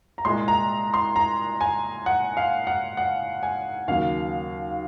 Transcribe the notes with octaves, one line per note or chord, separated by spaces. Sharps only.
A#5
C2 A#2 G#3 C6
A#5
C6
A#5
G#5
F#5
F5
F#5
F#5
G#5
D#2 C#3 F#3 A#3 F5